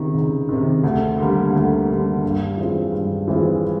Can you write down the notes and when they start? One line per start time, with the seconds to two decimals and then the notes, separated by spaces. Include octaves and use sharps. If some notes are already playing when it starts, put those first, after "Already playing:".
Already playing: C#2 C3 D#3
0.14 C#2
0.49 C3 D#3
0.84 D2
1.18 D3 G3 A#3
1.53 D2
1.88 D3 G3 A#3
2.24 G2
2.57 E3 G#3 C4 F4
2.93 G2
3.28 E3 G#3 C4 F4